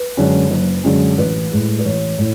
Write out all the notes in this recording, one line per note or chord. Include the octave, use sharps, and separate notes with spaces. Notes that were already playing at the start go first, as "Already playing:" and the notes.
Already playing: B4
F#2 D3 G#3 C#4
F#1
F#2 D3 G#3 C#4
A1 B4
A2 G#3
B4
A1 C#5
A2